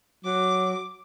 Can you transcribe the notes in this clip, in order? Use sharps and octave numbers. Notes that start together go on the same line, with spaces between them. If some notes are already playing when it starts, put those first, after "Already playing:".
F#3 D6